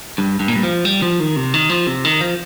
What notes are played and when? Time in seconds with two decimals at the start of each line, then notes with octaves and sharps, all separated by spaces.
0.18 G2
0.40 G2
0.48 A#2
0.56 G2
0.63 F3
0.85 G3
1.02 F3
1.20 D#3
1.36 C3
1.54 D#3
1.70 F3
1.87 C3
2.05 D#3
2.21 F3